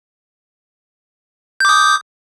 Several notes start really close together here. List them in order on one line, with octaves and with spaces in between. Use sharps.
G6 D6 D#6